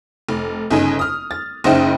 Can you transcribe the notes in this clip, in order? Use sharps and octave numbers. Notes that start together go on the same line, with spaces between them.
F1
G1 C#3 D#4 G#5
D#6 F6
A6
F#1 C#3 D#4 C5 E5 G5